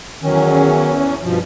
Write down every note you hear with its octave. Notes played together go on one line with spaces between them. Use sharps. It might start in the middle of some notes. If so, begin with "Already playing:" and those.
E2 D#3 F#3 C#4
G2 B2 F3